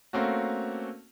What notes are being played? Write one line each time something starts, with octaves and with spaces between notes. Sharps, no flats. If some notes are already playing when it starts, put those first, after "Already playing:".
A3 A#3 C4 C#4 F#4